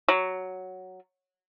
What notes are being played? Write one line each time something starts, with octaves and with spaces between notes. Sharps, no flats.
F#3